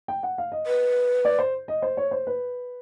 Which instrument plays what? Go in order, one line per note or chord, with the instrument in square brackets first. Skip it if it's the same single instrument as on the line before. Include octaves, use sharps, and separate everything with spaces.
[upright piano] G5
F#5
F5
D#5
[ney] B4
[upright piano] D5
C5
D#5
C5
C#5
C5
B4